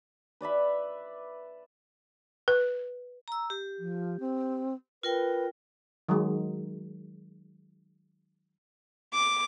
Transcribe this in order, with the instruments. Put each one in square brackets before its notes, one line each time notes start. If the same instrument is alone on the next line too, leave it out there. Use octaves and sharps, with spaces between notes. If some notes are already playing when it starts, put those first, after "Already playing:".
[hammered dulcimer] B4 D5 E5 B5
[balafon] B4
[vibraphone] A#5 E6
G4
[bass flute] F3
C4
[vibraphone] F4 A#4 G5 [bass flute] B4
[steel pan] D#3 F#3 G#3
[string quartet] D6